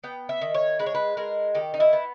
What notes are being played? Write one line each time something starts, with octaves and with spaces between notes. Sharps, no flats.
B3 G5
E5
D#3
C#5
G#3 B4
C#5
B4
G#3 A#4
D#3 G4
D#4
E4
B3